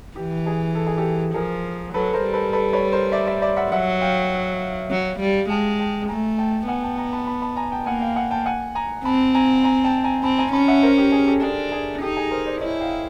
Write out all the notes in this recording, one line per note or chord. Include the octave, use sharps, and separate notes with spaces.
E3 G4
G#4
A4
G#4
G4 A4
F3 G#4 A#4
F#3 A4 B4
A#4 C5
G3
A4 B4
A4 B4
B4 C#5
A#4 C5
D5 E5
D5 E5
D5 E5
E5 F#5
F#3 E5 F#5
F5 G5
F#3
G3
G#3 G5 A5
G5 A5
A3 G#5 A#5
G5 A5
B3 F#5 G#5
G5 A5
G#5 A#5
A5 B5
A5 B5
A5 B5
G#5 A#5
G5 A5
A#3 F#5 G#5
F5 G5
F#5 G#5
G5 A5
F#5 G#5
G#5 A#5
C4 A5 B5
G#5 A#5
G#5 A#5
G5 A5
G#5 A#5
C4 A5 B5
G#5 A#5
C#4 A5 B5
E5 F#5
A#4 C5
G4
G#4
G4 A4
D4 G#4
G#4
D#4 G4 A4
G#4
A#4 C5
C5 D5
E4 C#5 D#5
F5 G5